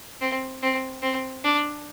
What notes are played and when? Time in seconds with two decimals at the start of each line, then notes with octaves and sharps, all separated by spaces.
0.21 C4
0.63 C4
1.02 C4
1.44 D4